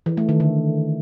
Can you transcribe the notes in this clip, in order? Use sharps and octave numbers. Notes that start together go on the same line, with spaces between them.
E3
A3
D#3
D3